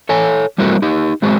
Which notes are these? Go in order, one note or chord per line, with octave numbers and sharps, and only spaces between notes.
A4 C#5 G#5
G3 A3 A#3 C4 E4 F#4
D#4 G4
F#3 G#3 C4 F#4 G#4